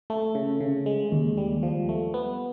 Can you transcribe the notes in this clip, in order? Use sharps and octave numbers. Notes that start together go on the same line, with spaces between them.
A3
C#3
C#3
G#3
D#2
G3
F3
A3
B3